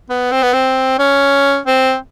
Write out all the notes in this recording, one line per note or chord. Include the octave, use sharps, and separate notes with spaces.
B3
C4
B3
C4
C#4
C4